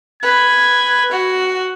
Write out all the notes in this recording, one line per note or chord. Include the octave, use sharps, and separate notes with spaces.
B4 G#6
F#4